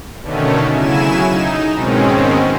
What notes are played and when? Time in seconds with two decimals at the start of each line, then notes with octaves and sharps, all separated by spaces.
0.22 B2 D3 D#3 A3 C#4
0.74 C#3 F#3 E4 G#5 E7
1.26 D#4
1.74 G#2 B2 D#3 G#3 C4 C#4